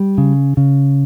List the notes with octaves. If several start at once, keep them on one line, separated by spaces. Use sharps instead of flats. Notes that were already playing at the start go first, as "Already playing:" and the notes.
Already playing: G3
C#3
C#3